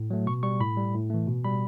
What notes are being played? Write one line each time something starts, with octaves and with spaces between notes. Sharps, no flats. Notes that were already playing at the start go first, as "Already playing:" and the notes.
Already playing: A2
F#3 A3
B2 C#6
G3 C#6
A2 B5
G3
A2
E3 A3
B2
G3 B5